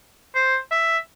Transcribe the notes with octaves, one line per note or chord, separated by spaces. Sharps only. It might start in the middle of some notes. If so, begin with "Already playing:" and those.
C5
E5